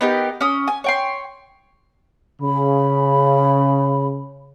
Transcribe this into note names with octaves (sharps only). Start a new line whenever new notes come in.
B3 D#4 G4 A#4
C#4 D#6
G#5
C#5 G5 C6
C#3 B5